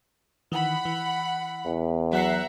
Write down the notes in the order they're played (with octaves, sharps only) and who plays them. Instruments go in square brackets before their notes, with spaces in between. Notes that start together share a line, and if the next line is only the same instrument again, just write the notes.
[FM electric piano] D#3 E3 [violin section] F#5 B5
[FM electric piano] E3
[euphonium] E2
[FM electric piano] F#3 F#6 C7 [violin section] E5 F#5 A#5